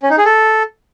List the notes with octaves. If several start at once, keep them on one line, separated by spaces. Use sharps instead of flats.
C#4
D#4
G#4
A4